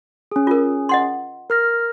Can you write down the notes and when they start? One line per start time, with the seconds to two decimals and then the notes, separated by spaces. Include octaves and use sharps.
0.32 C#4 G#4
0.47 F4 A#4
0.89 D#5 F#5 C6
1.50 A#4 F6 A#6